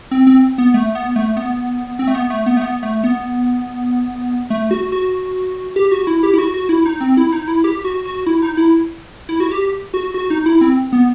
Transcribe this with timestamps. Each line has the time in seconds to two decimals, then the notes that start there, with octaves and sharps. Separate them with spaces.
0.11 C4
0.27 C4
0.58 B3
0.74 A3
0.95 B3
1.16 A3
1.37 B3
1.99 C4
2.07 A3
2.15 B3
2.30 A3
2.46 B3
2.57 A3
2.62 B3
2.83 A3
3.04 B3
4.50 A3
4.71 F#4
4.92 F#4
5.76 G4
5.91 F#4
6.07 E4
6.23 G4
6.34 E4
6.38 F#4
6.54 F#4
6.69 E4
6.86 D#4
7.01 C4
7.17 E4
7.32 D#4
7.48 E4
7.64 G4
7.84 F#4
8.05 F#4
8.26 E4
8.42 D#4
8.57 E4
9.29 E4
9.40 F#4
9.51 G4
9.94 F#4
10.14 F#4
10.30 D#4
10.46 E4
10.61 C4
10.93 B3